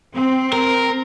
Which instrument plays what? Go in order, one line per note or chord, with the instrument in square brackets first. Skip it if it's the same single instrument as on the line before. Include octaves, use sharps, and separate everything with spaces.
[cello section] C4
[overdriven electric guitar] A#4